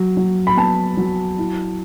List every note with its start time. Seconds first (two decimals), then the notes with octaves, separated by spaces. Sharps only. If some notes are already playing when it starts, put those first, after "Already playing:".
Already playing: F#3
0.17 F#3
0.47 B5
0.57 B3 A5
0.97 F#3
1.39 E4